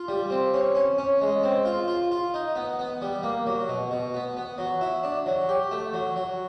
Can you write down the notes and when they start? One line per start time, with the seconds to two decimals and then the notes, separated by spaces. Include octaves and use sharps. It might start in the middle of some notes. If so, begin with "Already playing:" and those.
Already playing: F4
0.08 G3
0.30 C4
0.54 C#4
0.75 C#4
0.98 C#4
1.21 G#3
1.43 C4
1.65 F4
1.88 F4
2.12 F4
2.34 D#4
2.55 B3
2.79 B3
3.02 G3
3.23 A#3
3.46 F#3
3.69 B2
3.91 B2
4.14 B3
4.37 B3
4.58 F#3
4.81 E4
5.03 D4
5.26 F#3
5.49 G4
5.71 A3
5.94 F#3
6.16 F#3